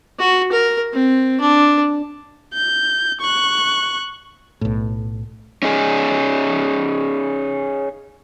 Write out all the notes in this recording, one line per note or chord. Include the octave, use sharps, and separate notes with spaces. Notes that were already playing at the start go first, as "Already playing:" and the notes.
F#4
A#4
C4
D4
G6
C#6 F#6
B1 A2
C#4 D#4 G#4